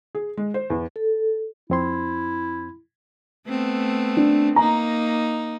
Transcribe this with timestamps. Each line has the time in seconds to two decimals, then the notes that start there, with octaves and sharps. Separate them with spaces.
0.15 G#4
0.37 G#3
0.54 C5
0.70 E2
0.96 A4
1.70 F2 C4 E4 C6
3.48 A3 B3 C4
4.17 D4
4.56 A#3 D#4 A#5